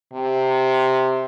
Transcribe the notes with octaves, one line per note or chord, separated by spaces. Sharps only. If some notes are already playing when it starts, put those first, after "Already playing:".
C3